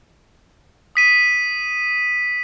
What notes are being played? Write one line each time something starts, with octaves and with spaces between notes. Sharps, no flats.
D#6 B6 D#7